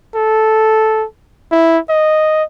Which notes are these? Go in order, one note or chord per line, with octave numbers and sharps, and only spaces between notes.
A4
E4
D#5